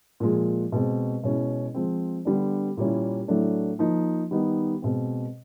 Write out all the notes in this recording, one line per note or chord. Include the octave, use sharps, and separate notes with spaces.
A#2 F3 G#3
B2 G#3 C4
B2 G#3 C#4 E4
F3 G#3 C4
D3 G3 B3 D4
A#2 G3 A#3 C#4 E4
A2 F#3 A3 D4
F3 A#3 D#4
D#3 G3 B3 D#4
B2 G#3 C4